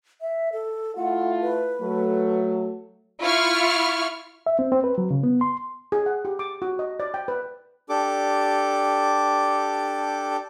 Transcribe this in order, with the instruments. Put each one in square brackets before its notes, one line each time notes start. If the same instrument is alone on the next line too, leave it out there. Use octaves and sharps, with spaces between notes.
[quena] E5
A4
[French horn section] A3 E4 F4 [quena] F#5
[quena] B4
[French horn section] F#3 A3
[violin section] E4 F4 C#6 F6
[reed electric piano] E5
C4
C4
B4
F#3
C#3
B3
C6
[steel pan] G#4
F#5
G4
D6
F#4
D#5
D5
G5
B4
[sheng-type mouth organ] D4 G4 A4 D6